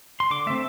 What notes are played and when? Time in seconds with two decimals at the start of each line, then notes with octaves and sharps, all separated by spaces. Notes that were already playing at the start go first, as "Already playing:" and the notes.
0.20 C6
0.31 D3 D6
0.46 A3 C4 E5